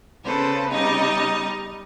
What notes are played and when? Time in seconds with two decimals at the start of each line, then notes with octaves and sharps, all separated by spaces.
0.24 C#3 B3 A4 B4 C5
0.71 G3 D#4 D#5